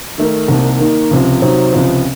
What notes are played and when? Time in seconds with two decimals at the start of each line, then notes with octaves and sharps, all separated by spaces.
0.18 D#3 A3 D#4 A#4
0.48 C2 C3 D#3 A#3
0.80 D#3 A#3 D#4
1.11 C#2 C3 F3
1.42 C3 F#3 C4 D#4
1.73 C#2 C3 F3